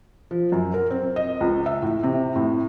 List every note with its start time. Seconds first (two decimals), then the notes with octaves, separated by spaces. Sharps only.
0.31 F3
0.52 F#2
0.74 A#4
0.91 C4
1.16 D#5
1.41 C#2
1.66 E5
1.82 A2
2.03 C3
2.36 A2